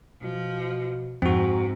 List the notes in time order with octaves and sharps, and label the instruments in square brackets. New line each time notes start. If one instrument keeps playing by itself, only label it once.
[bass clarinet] B2 [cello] F3
[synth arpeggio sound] F2 F3 [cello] G#2 [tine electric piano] C4 F#4